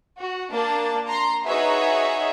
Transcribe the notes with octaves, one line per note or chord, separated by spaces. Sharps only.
F#4
A#3 D4 A5
A#5 C6
D#4 F#4 G#4 B4 C#5 E5